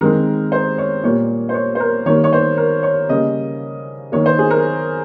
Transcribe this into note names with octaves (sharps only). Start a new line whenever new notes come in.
D#3 G#3 C4 A#4
C5
C#5
A#2 G3 A#3 C#5
C5
C#5
C5
A#4
D#3 G3 A#3 C#5
C#5
C5
A#4
C#5
C#3 G3 A#3 D#5
D#3 A#3 C#5
C5
G#4
A#4